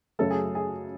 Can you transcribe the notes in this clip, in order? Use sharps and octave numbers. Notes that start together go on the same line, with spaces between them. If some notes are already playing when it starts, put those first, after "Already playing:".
F#2 C#3 F#3 A3 A4
G#4
G#4